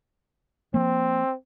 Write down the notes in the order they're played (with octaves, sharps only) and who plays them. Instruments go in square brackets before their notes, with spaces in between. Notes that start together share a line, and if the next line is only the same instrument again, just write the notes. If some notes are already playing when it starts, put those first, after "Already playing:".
[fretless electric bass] F3 A#3 [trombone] C4